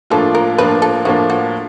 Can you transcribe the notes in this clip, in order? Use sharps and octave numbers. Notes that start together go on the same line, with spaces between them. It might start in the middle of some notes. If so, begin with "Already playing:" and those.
A2 F3 A#3 D4 F4 A4
A#4
A2 F3 A#3 D4 F4 B4
A4
A2 F3 A#3 D4 F4 F#4
F#4